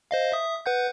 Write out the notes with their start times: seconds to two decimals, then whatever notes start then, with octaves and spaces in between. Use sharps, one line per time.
0.11 C5 D#5 F5
0.32 E5 D#6
0.66 B4 F#5 G6